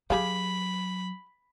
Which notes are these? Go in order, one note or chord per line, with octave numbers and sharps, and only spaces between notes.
F#3 G4 G#4 F5 B5